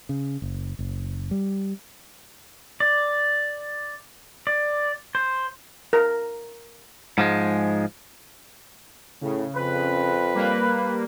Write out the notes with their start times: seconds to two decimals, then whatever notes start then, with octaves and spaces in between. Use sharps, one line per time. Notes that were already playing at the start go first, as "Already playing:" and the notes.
0.09 C#3
0.42 F#1
0.79 F#1
1.31 G3
2.80 D5
4.47 D5
5.15 C5
5.93 A#4
7.18 G#2 F3 G#3
9.21 A2 C#3
9.57 F2 B4
10.34 G3 A#3